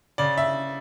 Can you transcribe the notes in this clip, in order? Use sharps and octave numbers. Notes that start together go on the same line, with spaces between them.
C#3 D5
E5